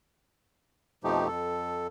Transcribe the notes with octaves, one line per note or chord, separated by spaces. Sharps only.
F2 B2 F3 A3 D#4 G4
F2 A4